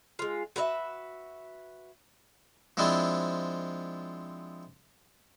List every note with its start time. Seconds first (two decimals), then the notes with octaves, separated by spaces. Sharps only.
0.19 G#3 F4
0.56 F#4 B4 C#5 E5
2.77 F3 G#3 C4 D4 E4 F4